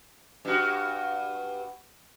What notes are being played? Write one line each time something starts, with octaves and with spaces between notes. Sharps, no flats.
G2 F#4